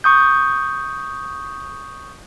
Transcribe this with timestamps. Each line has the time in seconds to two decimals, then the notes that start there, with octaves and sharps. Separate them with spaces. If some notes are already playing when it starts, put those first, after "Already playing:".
0.04 C#6 D#6 G6